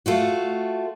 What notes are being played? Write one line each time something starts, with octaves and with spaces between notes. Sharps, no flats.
A3 F4 F#4